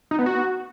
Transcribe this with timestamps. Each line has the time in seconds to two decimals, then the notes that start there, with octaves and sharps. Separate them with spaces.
0.11 D#4
0.19 B3
0.26 F#4